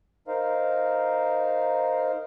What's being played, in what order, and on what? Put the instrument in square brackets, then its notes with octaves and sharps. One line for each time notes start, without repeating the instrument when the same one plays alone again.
[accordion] D#4 A#4 C5 F5